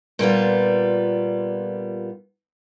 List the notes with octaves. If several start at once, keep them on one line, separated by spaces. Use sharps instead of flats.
A#2 G3 B3 F4